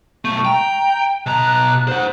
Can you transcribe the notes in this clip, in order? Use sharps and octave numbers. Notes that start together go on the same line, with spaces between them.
B1 A3 C#6
G5 A#5
B2 A#5 F#6
C5 F#5